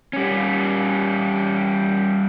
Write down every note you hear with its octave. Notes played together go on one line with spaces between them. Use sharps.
G3 C#4